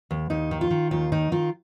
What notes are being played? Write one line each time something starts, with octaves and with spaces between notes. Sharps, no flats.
D#2
D#2 D#4
D#3
F4
D#3
D#2 F4
D#3 D#4
D#3 F4